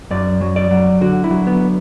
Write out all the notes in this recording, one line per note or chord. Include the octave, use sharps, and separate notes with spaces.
F#2 D5
F#3
D5
F#3
D3 F#4
E4
F#3
B3